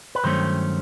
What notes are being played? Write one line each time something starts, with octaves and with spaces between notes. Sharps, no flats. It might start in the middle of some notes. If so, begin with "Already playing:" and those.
B4
G2 D#3 F#3 A3 C#4 C5